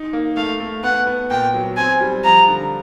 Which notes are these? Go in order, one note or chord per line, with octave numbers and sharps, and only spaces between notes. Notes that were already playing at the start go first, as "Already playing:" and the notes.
Already playing: D#4
A#3
A3 F5
A3
B3 F#5
B3
A#2 G5
F#3
C4 G#5
G3
F3 A#5
D3